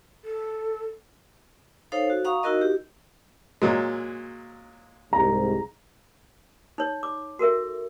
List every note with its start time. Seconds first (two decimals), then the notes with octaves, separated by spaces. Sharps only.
0.24 A4
1.92 D#4 A4 C5 C#5 F5
2.10 F#4
2.25 F5 F#5 A#5 C#6 D#6
2.43 D#4 E4 F#4 A#4 D#5
2.61 G4
3.62 A#2 F#3 G#3
5.13 C2 G#2 A#5
6.78 D#4 C#5
7.03 D6
7.39 F#4 A4 A#4 E5